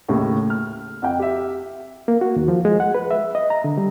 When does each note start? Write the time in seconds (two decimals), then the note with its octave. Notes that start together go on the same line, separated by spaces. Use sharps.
0.09 D#2 A2 C#3
0.50 F6
1.02 F2 F#5 G5
1.19 G4 E5
2.08 A#3
2.21 F#4
2.36 D#2
2.48 F3
2.65 G#3
2.80 F#5
2.95 B4
3.11 E5
3.35 D#5
3.50 A#5
3.64 D3
3.77 G3